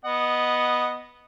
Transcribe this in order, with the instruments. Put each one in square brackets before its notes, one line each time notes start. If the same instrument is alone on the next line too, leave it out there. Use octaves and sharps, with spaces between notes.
[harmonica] B3 D#5 F#5